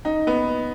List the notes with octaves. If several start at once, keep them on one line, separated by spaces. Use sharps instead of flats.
D#4
B3